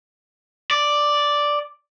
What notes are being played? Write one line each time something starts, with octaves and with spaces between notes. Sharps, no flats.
D5